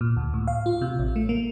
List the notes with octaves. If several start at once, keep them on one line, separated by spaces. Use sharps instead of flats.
A#2
D2
A2
F5
F4
C3
A1
A3
A#3